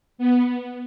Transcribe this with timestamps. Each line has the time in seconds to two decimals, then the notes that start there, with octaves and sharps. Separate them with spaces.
0.18 B3